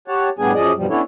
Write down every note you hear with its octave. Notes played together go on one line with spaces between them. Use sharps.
G4 C#5 F#5 A5
A2 G3 B3 D4 G#4 G#5
F#2 F3 G#4 D5 D#5
E2 G2 B2 F3 G3
B3 C#4 D4 E4 A4 C#5